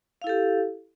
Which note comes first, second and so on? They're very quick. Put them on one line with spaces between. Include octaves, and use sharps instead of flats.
F5 E4 A4 G4